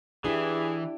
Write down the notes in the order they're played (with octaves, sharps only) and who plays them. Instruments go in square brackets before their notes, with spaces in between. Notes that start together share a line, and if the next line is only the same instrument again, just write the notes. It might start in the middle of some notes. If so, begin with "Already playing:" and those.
[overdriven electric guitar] E3 [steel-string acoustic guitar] D4 E4 G4 [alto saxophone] G#4